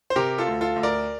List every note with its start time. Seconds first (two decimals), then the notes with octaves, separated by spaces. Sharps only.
0.10 C5
0.16 C3 G4 A#4
0.38 F4 A4
0.47 D2
0.61 F4 A4
0.76 D2
0.83 A#4 D5